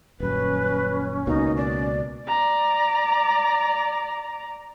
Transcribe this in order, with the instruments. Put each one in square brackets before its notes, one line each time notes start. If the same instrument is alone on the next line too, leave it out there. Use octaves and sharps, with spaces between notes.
[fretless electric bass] D#1 F#2 [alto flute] C#4 [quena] B4
[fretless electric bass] C#2 B2 A#3 [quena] D#4
[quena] D5
[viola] D5 A#5